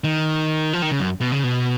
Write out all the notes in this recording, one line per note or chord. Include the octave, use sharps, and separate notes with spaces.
D#3
F3
D#3
C#3
F#2
B2
C#3
B2